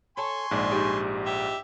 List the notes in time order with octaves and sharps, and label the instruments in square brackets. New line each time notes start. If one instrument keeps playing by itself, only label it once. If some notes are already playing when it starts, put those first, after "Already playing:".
[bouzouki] A4 C#5 [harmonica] G#5 C6 C#6
[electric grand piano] A#1 G#2 [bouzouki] D4
[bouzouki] G3 G#3 D#4
[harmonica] G4 E5